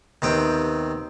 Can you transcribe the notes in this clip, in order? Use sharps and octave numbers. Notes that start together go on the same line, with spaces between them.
D#2 C3 B3 G5